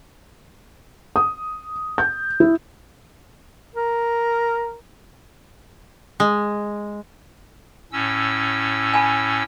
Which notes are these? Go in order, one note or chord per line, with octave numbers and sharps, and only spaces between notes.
D#6
G6
E4
A#4
G#3
A2 C#4 E6
G#5 A5 B5